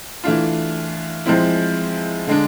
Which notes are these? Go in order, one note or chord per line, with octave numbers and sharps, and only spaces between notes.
E3 A3 D4 F4
F3 G#3 C4 E4
D3 G#3 D4